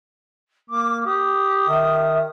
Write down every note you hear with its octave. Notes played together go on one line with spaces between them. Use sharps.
A#3 D6
G4 D#6
D#3 E5